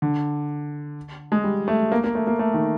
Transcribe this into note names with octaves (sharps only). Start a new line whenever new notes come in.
D3
G#3
G3
A3
A#3
A#3
A3
A#3
A3
D#3